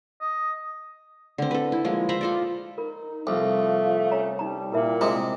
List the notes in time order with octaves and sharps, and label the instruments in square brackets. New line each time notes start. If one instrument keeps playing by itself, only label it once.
[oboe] D#5
[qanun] D3 C4
A4 B4
E4
F3 G#3 A#3
C5 E5 A#5 B5
F4 A4 D5
[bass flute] D#4 [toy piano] A#4
[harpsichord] C2 [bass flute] F3 [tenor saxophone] A3
[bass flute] C#4 [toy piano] C#5 A#5
[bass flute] G3 [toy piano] D#4 A#5
[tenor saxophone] A#2 [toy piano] E4 A#4 E5
[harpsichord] C3 G#3 [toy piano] A#5